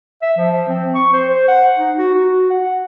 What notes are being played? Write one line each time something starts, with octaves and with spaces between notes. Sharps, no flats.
E5
F3
C4
C#6
C5
C5
F#5
D#4
F#4
F#4
F#5